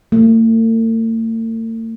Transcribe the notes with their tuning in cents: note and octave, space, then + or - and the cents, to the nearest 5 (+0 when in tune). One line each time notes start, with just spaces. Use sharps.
A3 +45